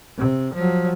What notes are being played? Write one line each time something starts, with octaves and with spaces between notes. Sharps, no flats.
C3
F3 F#3